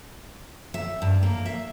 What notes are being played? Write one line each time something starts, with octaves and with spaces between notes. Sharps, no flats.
E5
G2
A#3
E5